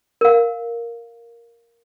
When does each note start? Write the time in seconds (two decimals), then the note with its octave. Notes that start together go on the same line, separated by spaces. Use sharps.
0.21 A#4 F5